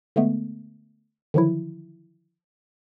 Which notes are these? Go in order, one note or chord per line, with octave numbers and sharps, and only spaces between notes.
D3 G#3 A3 B3
D3 D#3 F3 F#3 E4